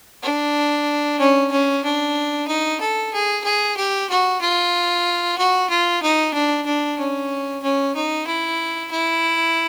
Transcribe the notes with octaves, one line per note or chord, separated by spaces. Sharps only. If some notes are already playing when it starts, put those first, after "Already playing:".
D4
C#4
C#4
D4
D#4
A4
G#4
G#4
G4
F#4
F4
F#4
F4
D#4
D4
D4
C#4
C#4
D#4
E4
E4